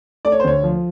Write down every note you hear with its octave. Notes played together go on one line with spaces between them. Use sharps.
A3 D5
C#5
C5
D2 C#5
F3